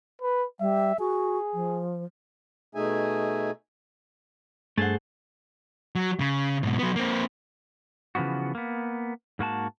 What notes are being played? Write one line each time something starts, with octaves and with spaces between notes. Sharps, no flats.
B4
G3 E5
F#4 G#4
F3
B2 A3 D#4 G#4 E5 G#5
G2 A3 G#4 A4 C5 F#5 A6
F#3
C#3
G#2 B2
F#3 B3
A#3 C4
C#3 E3 F3 B3 F#4
A#3 B3
G#2 A#3 F#4 A5